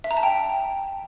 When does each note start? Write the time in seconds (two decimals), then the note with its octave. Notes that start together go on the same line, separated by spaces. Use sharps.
0.04 E5
0.11 A#5
0.17 A5
0.23 G5